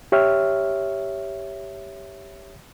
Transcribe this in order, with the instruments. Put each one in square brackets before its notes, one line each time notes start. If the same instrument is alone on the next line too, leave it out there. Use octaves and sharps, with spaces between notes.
[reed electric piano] G4 C#5 E5 F6